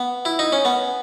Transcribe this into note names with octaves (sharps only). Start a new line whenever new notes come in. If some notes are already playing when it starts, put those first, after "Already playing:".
Already playing: B3
E4
D#4
C#4
B3